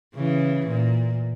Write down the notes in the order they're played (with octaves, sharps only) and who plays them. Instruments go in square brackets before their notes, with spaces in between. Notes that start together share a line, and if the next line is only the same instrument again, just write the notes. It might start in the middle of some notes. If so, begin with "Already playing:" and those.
[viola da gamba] C#3 E3
A#2